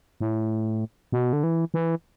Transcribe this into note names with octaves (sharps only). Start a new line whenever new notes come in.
A2
B2
D3
E3
E3